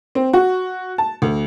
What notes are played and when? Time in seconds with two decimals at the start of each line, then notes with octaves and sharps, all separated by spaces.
0.15 C4
0.33 F#4
0.98 A5
1.22 D2